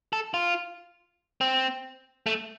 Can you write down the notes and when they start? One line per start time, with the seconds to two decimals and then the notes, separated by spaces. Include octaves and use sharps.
0.13 A4
0.34 F4
1.41 C4
2.26 A3